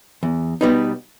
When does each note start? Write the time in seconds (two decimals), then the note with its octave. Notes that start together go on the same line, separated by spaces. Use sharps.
0.23 E2
0.61 B2 G3 B3 D#4